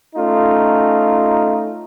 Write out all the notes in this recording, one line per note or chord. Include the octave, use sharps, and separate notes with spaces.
A3 C#4 D#4 F4